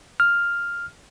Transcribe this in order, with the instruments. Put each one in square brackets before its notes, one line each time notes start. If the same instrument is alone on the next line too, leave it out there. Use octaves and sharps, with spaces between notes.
[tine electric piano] F6